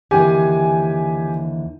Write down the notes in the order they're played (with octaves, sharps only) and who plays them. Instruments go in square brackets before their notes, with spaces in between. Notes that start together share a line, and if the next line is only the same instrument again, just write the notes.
[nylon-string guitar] D#2 D3 E3 [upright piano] G4 G#5